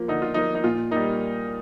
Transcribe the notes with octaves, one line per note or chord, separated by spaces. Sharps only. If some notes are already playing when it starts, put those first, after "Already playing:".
Already playing: F3 A#3
D3 D#4
F4
F3 A#3 D#4
D#4
A#2 F4
G3 A#3 D#4